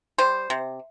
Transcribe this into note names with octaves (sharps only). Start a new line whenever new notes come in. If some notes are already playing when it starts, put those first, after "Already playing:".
G3 C5
C3